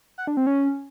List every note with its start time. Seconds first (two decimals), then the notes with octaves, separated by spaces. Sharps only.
0.18 F#5
0.27 D4
0.37 C4
0.47 C#4